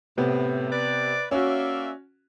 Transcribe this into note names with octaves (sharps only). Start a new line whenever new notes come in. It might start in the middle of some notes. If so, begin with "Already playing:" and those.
A2 C3 B3
B4 D5
A#3 C#4 F#4 D5 E5